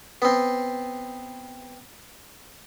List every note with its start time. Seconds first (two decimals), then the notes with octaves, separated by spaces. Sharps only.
0.22 B3 C4